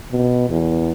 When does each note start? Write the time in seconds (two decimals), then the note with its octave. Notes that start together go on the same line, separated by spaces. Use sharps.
0.12 B2
0.50 E2